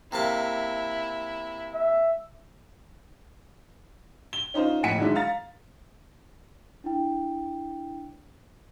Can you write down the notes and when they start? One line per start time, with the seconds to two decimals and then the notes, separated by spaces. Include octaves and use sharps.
0.12 C3 A#3 E4 A5
1.74 E5
4.33 G7
4.54 C#4 D#4 F4 C5
4.83 F1 A2 F#5 G#5 B6 C#7
4.98 D3 D#3 F#3 G#3 D4 E4
5.15 F5 A#5 A6
6.84 D4 E4 G5